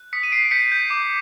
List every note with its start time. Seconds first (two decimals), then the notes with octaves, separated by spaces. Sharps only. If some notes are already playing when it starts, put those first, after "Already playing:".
Already playing: F#6
0.13 D#6 B6 C#7
0.23 D#7
0.32 D#6 C7 D7
0.51 G6 B6 C#7
0.72 G6
0.90 D6